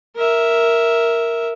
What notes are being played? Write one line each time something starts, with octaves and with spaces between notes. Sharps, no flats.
A#4 E5